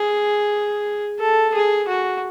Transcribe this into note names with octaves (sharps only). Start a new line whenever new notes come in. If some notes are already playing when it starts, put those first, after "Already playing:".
Already playing: G#4
A4
G#4
F#4